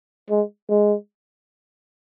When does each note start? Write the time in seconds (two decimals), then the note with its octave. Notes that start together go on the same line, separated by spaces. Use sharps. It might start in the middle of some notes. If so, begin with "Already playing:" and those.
0.30 G#3
0.69 G#3